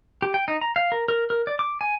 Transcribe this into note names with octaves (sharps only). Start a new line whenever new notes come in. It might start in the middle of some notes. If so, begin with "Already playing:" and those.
G4
G5
D#4
A#5
F5
A#4
A#4
A#4
D5
D6
G#5